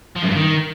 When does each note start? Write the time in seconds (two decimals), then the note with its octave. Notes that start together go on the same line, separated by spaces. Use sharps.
0.16 F3
0.23 F#2
0.29 G2
0.36 D#3